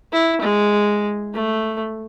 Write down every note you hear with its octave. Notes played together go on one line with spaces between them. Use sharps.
E4
G#3
A3